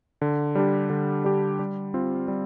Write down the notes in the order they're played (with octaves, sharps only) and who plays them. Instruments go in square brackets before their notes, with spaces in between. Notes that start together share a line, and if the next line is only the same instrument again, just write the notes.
[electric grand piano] D3
G3 D4 G4
D3
G3 D4 G4
G3
C4 F4
G3